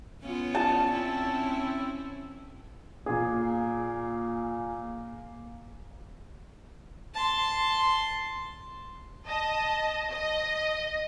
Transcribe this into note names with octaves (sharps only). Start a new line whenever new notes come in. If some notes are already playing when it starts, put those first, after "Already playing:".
B3 C#4 F4
A5
C4 C#4 E4
A#2 A#3 G#4
A5 C6
D#5 A5
D#5